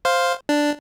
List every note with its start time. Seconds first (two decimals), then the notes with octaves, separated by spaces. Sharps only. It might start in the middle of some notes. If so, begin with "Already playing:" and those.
0.05 C5 F5
0.49 D4